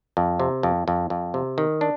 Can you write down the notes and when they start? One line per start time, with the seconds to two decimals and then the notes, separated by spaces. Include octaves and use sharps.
0.17 F2
0.40 C3
0.63 F2
0.88 F2
1.10 F2
1.34 C3
1.58 D#3
1.81 D4